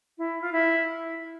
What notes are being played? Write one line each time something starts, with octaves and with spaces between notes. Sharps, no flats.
E4
F4
E4